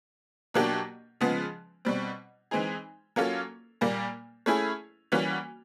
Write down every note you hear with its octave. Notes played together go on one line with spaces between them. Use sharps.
B2 F#3 A#3 D4 G4
C#3 F3 G#3 B3
B2 G3 C4
E3 G#3 C4 D#4 G#4
F#3 A#3 C#4 F4 A4
A#2 G3 A#3
A3 C#4 E4 G#4
E3 G3 A#3 C#4 F#4